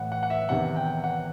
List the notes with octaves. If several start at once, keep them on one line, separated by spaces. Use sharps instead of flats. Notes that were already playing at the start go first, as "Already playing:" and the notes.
Already playing: A2 E3 F#5
F#5
F#5
E5
E2 C3 D#3 F#5
G5
F#5